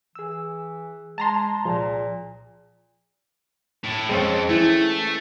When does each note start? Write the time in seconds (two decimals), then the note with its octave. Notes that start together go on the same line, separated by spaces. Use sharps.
0.15 E3 G#4 E6
1.18 G#3 A5 A#5 C6
1.65 C2 A#2 F3 G#4
3.84 A2
4.09 F2 G#3 C4 C#4
4.49 E3 A3